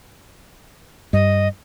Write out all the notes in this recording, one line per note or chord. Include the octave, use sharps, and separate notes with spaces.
G2 D#5